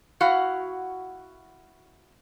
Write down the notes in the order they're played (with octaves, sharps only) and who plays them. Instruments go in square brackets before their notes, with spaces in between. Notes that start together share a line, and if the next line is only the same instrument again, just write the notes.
[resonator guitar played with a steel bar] E4 F#4 F5 F#5